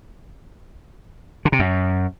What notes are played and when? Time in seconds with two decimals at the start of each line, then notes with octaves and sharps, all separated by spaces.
1.45 D3
1.52 C3
1.59 F#2